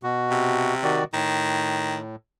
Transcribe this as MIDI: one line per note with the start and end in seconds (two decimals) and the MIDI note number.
0.03 0.74 47
0.03 0.74 66
0.30 0.99 48
0.83 1.04 51
0.83 1.04 66
0.83 1.04 74
1.14 2.16 45
1.14 1.98 51